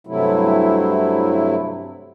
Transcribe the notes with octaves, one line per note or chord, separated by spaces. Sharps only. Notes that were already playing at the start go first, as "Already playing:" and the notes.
G2 C3 F#3 A3 E4